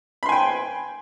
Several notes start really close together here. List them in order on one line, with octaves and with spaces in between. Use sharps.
B5 C6 G#5 G5